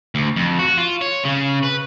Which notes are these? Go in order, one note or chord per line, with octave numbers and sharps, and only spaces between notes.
D2
F2
F#4
F4
C#5
C#3
B4